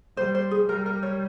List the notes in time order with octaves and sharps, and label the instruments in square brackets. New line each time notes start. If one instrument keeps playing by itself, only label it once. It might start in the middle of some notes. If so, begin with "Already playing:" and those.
[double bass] G3 [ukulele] C5
[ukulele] C5
G#4
[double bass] G3 [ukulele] A#4
[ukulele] A#4
C#5